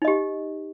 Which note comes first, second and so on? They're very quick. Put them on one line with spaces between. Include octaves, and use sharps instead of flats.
D#4 D#5 G4